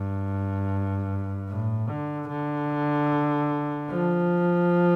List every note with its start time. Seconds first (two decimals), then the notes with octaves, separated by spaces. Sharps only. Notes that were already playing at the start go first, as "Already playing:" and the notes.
Already playing: G2
1.49 A2
1.89 D3
2.29 D3
3.91 F3